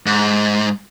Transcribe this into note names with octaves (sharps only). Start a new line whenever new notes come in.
G#2